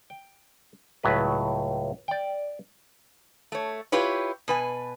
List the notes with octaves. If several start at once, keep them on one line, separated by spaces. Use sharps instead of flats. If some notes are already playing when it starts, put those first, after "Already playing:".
G5
C#2 A2 F#3 B4
D5 G5
A3 C#5
E4 F4 G4 B4 C#5
B2 B4 G#5